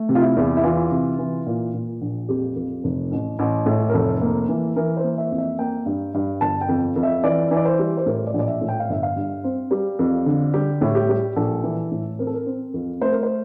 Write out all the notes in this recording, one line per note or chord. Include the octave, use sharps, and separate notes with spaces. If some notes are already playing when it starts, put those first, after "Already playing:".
Already playing: A3
C3
F4
E4
E2
E4
E3 F4
C3
E3
A#2
A#2
A#1
F2 G4
F2
F1
A1
A1
A2
A#4
F1 A4
A#3
E3
E3 A#4
C5
A#3
E5
F2
E5
A#3 G5
G2
G2
G1 A5
G5
F2
F2
E5
E3 D5
E3
D5
C5
G3
C5
A2 A#4
D5
A#1
D5
E5
A2
G5
F5
G1 E5
F5
G2
C4
G3
F2
D3
G3 G4
A2
G4
G3
A#1 A4
E3
A2
C4 A#4
A4
A#4
C4
F2
A3 C5
A#4
C5